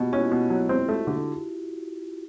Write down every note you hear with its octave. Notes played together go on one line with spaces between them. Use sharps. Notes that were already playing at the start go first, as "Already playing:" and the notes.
Already playing: B2 F4 G4
C#4 E4 F#4
B2
F#3
C4
A3
D3